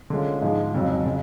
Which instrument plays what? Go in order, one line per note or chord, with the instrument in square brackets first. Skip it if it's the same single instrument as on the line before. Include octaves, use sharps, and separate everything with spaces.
[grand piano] D3 G#3 C#4 F4
G#2 F3 G#3
F2 C#3 F#3
C#3 G#3